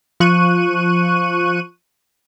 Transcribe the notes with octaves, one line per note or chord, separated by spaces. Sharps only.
F3 C#6 F#6 D#7